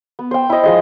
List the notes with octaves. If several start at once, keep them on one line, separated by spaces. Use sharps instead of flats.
B3
C5 G5
E4 D#5
F3 G#3 D#5